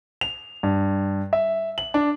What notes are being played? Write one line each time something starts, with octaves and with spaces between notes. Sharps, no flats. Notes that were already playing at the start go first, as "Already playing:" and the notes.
F7
G2
E5
F#7
D4